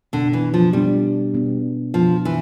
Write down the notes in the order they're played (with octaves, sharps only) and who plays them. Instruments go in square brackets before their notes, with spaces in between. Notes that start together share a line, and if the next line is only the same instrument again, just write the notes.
[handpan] B2 B3 D4 [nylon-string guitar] D3
[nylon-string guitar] E3
F3
[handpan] B2 B3 D4 [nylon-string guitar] G3
[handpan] B2 B3 D4
[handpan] B2 B3 D4 [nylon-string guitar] F3
[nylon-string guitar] E3